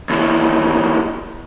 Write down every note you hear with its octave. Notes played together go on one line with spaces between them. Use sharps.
D#2 E3